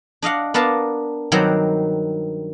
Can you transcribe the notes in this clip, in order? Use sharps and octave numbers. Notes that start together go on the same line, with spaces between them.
D4 D#5 F5 F#5
B3 D4 A#4 F5 A5
G2 D#3 F#3 C4 C5 F#5